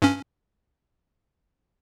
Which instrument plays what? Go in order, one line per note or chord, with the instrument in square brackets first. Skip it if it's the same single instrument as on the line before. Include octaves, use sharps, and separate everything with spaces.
[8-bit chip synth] G2 C#4